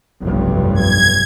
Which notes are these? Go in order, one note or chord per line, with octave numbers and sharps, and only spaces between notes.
F1 B1 G2
G#6